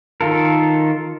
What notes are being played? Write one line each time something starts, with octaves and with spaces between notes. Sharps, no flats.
D#3 F4 A4 A#4